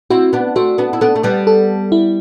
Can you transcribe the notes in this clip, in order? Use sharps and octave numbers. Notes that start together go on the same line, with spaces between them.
C4 E4 F#4
B3 D4
A3 C4 F#4
B3 D4
E4
B3 D4 A4
A3
G3 B3
A4
E4